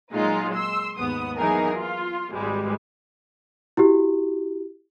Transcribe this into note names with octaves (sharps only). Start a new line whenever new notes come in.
A#2 F#3 G#3 D#4 F4
C6 E6
D#2 G#2 B3 D#6
E3 F#3 B3 D#4 G#4 A#4
F4
G#1 G#2 G3 G#3 B4
E4 F#4 G4